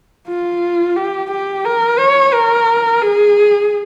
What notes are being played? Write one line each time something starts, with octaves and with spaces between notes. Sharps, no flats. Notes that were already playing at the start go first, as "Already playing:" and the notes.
F4
G4
G4
A#4
C#5
A#4
G#4